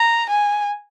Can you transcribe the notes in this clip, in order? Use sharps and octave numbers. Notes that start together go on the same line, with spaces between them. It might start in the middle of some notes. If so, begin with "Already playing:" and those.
Already playing: A#5
G#5